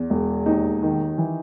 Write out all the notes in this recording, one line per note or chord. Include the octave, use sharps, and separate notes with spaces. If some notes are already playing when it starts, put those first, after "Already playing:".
Already playing: E2
E1
D#2 D#4
D#3
E3